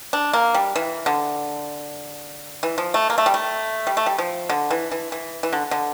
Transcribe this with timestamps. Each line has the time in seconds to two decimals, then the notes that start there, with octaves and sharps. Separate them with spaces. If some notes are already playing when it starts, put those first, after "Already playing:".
0.13 D4
0.33 A#3
0.54 G3
0.76 E3
1.06 D3
2.63 E3
2.78 F3
2.94 A3
3.10 A#3
3.18 A3
3.26 G3
3.34 A3
3.87 G3
3.97 A3
4.06 G3
4.18 F3
4.49 D3
4.71 E3
4.91 E3
5.12 E3
5.43 E3
5.53 D3
5.71 D3